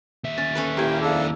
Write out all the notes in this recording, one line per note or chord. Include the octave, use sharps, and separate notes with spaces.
D#2 E5
C#4 A6
C#4 A4 B4
A#2 A#3 E4 G4 G5 G#6
F2 D4 G#4 A4 F5